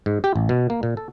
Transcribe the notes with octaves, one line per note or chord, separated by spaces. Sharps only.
G#2
G4
A1
B2
A#3
A#2
A4